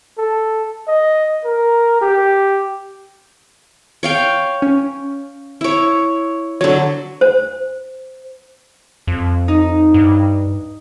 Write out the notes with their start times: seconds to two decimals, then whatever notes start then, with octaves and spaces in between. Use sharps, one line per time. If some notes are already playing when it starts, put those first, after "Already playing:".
0.18 A4
0.88 D#5
1.45 A#4
2.01 G4
4.03 C#5 F5 G5
4.62 C#4
5.61 E4 C#5
6.61 D3 F#3 C#5
7.21 C5
9.07 F2
9.48 D#4
9.94 G2